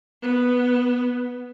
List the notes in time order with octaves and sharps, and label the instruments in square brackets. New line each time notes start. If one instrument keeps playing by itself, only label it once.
[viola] B3